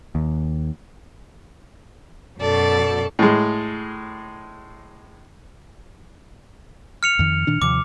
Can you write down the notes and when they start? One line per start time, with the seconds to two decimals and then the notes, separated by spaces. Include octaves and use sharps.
0.15 D#2
2.37 F#2 B2 A4 D5
3.19 A2 G#3
7.03 F6 C#7 F7
7.19 F2 D#3
7.47 A#2 D#3 D4
7.62 D#2 C3 F3 D6